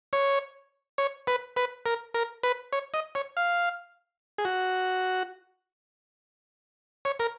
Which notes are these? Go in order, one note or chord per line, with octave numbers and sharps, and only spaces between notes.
C#5
C#5
B4
B4
A#4
A#4
B4
C#5
D#5
C#5
F5
G#4
F#4
C#5
A#4